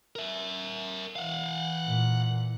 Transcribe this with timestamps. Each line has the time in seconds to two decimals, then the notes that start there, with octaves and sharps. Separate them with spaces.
0.16 A#4 E5
1.16 E3 F5 F#5
1.86 A#2